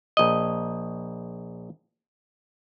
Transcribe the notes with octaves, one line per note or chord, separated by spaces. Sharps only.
A#1 D#5